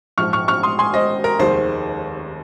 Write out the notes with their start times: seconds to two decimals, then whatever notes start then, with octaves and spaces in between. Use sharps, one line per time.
0.18 A#1 G#2 F3 C#6 F6
0.33 C#6 F6
0.48 C#6 F6
0.63 C6 D#6
0.79 G#5 C6
0.94 C5 D#5
1.24 A#4
1.39 F1 D#2 D#3 G#3 C5